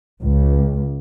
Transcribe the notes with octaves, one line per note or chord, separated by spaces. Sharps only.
C#2